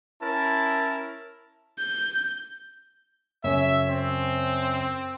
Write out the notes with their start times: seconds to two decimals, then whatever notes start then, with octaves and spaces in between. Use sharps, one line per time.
0.21 C#4 E4 A#4 A5
1.79 G6
3.44 F#2 C#3 C#5 E5
3.89 C4